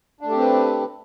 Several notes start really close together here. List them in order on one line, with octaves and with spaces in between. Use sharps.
D4 A3 G4 C4 B4